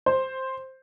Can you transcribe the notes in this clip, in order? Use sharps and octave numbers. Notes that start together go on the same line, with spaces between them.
C5